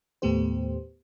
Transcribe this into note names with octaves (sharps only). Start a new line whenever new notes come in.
D#2 A2 A3 B3 G4 C5